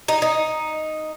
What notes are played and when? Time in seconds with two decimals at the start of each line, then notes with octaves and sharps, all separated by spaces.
0.08 D#4
0.22 D#4